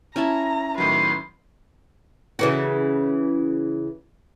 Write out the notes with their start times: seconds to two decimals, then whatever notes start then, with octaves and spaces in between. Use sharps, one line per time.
0.16 C#4 E4 A5 A#5
0.78 A2 D#3 F#3 B4 C6
2.39 C#3 E3 F#4